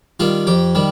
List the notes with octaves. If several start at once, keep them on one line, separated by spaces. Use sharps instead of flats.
D#3 G3 F4
F2 G4
D#3 G3